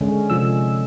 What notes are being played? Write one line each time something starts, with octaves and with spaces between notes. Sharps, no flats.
D3 G#3 C#4
C3 F3 E6